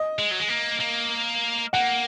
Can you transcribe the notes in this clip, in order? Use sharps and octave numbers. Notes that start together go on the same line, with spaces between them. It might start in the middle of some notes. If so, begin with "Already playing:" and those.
Already playing: D#5
G#3
F#3
G#3
A#3
A#3
A#3 F#5